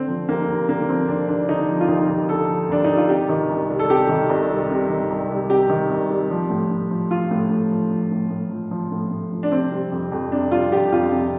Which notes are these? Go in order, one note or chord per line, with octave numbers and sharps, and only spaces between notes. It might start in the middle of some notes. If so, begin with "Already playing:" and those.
Already playing: D3 C4
F3
D#2 A#3
D#2
D3 A#3
F3 C4
D#2 D4
D#2 D4
D3 D#4
F3
F4
D#2 D#4
D#2
D3 A4
F3
D#2 D4
D#2 D#4
F4
C3 G4
D#3
C2
G3
A4
C3 G4
D#3
C2
G3
C3
D#3
C2
G3
C3 G4
D#3
C2
G3
F3
A2
A2
F3
F3 F4
A2
A2
F3
F3
A2
A2
F3
F3
A2
A2
F3
D4
C3 C4
G3
F2
F2
C3 D4
G3 F4
F2 G4
F2 F4
C3